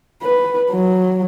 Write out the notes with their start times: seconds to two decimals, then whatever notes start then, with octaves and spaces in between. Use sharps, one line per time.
0.22 B4
0.71 F#3